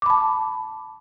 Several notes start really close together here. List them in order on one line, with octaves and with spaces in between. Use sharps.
D6 B5 A5